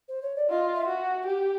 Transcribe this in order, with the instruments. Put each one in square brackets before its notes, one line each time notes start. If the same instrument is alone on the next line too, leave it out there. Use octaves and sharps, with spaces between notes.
[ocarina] C5
C#5
D5
[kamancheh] F4 [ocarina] D#5
[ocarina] E5
[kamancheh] F#4
G4